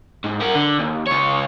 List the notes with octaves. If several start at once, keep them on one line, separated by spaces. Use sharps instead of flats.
G#2
A#4 F#5
D3
D#2
C#2 C#5